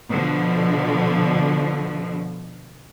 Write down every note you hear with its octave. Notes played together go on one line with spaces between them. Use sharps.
B2 D3 F3